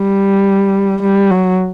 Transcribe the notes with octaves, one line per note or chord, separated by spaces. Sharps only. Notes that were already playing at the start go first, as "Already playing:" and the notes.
Already playing: G3
G3
F#3